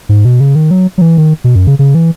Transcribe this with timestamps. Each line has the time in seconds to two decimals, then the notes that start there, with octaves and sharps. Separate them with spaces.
0.09 G#2
0.25 B2
0.40 C#3
0.55 D#3
0.71 F#3
0.98 F#3
1.01 E3
1.17 D#3
1.44 B2
1.55 F#2
1.67 C#3
1.79 C#3
1.95 E3